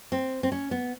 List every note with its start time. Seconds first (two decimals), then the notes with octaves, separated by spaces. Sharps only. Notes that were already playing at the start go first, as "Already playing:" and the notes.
0.12 C4
0.43 C4
0.52 C#4
0.71 B3